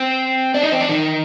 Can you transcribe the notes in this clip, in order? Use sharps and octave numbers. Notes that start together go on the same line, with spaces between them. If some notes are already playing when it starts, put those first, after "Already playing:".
Already playing: C4 C5
D4 D5
D#4 D#5
C4 C5
D4 D5
D#3 D#4